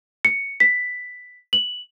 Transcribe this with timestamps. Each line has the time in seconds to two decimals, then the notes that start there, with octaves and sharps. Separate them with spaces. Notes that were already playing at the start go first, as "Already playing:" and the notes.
0.25 C#7
0.60 B6
1.53 F#7